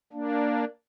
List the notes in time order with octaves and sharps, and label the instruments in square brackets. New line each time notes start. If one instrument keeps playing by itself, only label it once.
[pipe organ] A#3 D4